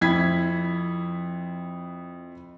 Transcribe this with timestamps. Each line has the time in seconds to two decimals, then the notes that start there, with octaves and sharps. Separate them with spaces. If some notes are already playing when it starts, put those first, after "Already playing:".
0.01 F2 E4 G#6 B6